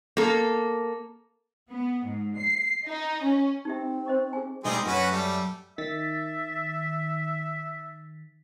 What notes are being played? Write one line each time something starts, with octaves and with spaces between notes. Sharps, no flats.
A#3 A4
B3
G#2
C7
D#4
C#4
C4 D#4 G4 E5
C5 D#5 C#6
G#4 G#5
D2 G3 G#3 C4 D#4 G#4
F#2 C#4 F#4 B4
G3 A3
D#3 E5 A6 B6